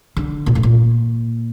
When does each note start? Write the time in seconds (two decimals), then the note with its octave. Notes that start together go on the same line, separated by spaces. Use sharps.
0.17 D3
0.46 A#2
0.55 A2
0.63 A#2